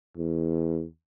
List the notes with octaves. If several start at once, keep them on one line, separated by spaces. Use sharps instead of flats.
E2